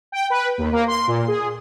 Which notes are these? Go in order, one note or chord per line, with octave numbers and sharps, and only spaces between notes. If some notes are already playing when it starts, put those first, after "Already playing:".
G5
B4
D#2
A#3
C6
A#2
G#4